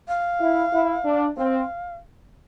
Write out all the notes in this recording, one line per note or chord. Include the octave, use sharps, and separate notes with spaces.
F5
E4
E4
D4
C4 F5